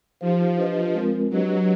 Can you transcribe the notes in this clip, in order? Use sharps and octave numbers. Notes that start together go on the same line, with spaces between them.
F3 D#4 G4 C5 F5
D4 G4 B4 D#5
G#3 C4 F4 A#4
F#3 D4 G4 B4 D#5